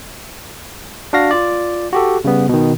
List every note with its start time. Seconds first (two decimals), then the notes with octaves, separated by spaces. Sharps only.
1.13 D4 F#4 F5 A#6
1.31 F4 D5
1.93 F#4 G4 A4
2.25 C#3 G3 B3
2.49 B2 D#3